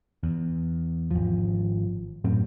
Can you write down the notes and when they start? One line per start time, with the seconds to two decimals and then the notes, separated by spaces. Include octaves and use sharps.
0.23 E2
1.11 G#1 F3
2.24 F#2 A2 F#3 C4